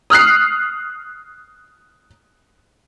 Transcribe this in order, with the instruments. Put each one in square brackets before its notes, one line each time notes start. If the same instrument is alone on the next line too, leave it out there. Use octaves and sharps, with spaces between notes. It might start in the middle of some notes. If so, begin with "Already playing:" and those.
[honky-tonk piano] D#6 F6 F#6 C7